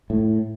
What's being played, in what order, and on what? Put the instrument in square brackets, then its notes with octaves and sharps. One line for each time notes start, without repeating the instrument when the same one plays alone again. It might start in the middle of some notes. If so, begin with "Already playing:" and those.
[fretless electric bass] A2